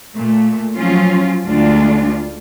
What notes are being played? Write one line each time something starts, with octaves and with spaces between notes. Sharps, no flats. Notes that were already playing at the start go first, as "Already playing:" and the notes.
A#2 A3
F3 F#3 C#4 F4
D2 G#3 D4 F4